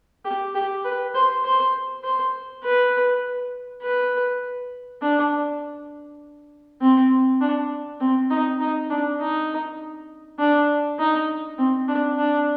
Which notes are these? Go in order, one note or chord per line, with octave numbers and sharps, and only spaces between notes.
G4
G4
B4
C5
C5
C5
B4
B4
D4
C4
D4
C4
D#4
D#4
D4
D#4
D4
D#4
C4
D4
D4